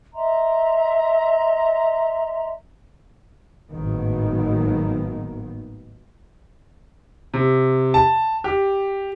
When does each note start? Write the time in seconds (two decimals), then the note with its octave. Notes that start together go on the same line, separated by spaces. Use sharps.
0.13 D#5 E5 A#5 C6
3.71 G#1 A2 D#3 F#3 A#3 B3
7.34 C3
7.94 A5
8.44 G4